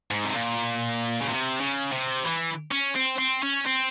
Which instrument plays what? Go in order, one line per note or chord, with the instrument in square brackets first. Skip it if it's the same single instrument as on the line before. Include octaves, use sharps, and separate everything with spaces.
[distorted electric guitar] G#2
C3
A#2
C#3
C3
C#3
C3
E3
C#4
C4
C4
C#4
C4